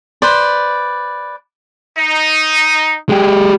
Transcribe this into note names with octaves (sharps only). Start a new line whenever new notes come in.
B4 C5 D5
D#4
G#3 G4